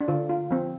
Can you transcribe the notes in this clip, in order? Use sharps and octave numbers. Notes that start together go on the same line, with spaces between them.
D4
D3 F4
F4
F3 C4